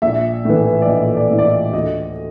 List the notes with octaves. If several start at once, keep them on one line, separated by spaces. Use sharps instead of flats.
A#1 E5
A2 E3
D5
A#1 D#5
D5
A2 E3
D5
D#5
D2 D#5